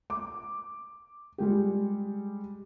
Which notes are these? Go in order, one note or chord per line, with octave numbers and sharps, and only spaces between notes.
D6
G3 G#3 G4